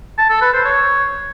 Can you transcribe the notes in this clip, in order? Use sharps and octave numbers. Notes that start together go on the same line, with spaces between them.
A5
A4
B4
C5
C#5